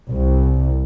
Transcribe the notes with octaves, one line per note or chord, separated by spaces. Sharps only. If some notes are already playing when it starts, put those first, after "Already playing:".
C2